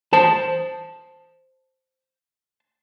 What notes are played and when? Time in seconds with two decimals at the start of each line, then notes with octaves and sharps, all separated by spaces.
0.13 C5 A5